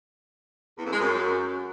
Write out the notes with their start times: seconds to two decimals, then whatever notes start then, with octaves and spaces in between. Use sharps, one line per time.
0.78 E2
0.85 F2
0.92 G#3
0.99 F#2